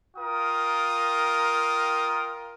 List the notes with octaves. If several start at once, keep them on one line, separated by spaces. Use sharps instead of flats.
F4 A#4 G5 D#6